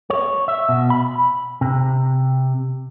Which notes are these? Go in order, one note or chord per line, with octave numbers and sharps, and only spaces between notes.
C#5
E5
B2
B5
C3